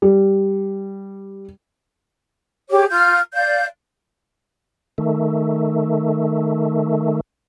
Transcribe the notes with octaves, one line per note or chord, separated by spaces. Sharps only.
G3
G4 G#4 C#5 D6
F4 F6 G6
D5 F5 G6
D#3 A3